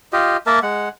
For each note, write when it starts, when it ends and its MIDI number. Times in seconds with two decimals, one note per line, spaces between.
0.13 0.37 65
0.13 0.37 67
0.13 0.37 75
0.47 0.59 58
0.47 0.59 70
0.47 0.59 76
0.47 0.59 81
0.63 0.89 56
0.63 0.89 78